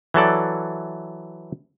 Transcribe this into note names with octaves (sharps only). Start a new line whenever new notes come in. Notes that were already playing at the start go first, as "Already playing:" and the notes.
E3 F#3 A4 D5